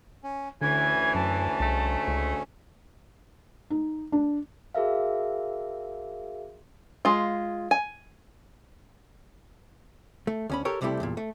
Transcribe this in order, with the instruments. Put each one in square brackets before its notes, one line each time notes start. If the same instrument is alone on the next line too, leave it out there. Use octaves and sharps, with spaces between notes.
[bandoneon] C#4
[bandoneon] D2 C#4 [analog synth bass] D3 [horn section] E3 [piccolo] G#6
[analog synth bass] F#2 [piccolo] A5
[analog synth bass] C2 [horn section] G#2 A3
[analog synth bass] C#2
[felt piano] D#4
D4
[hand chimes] F#4 G#4 A#4 E5 F5
[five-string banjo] G#3 F4
G#5
[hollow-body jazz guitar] A3
D2 C#4 B5
G4 A4 A#4 C#5
C2 C3 G3 A3 E4 G4
E2 G2 A#2
A3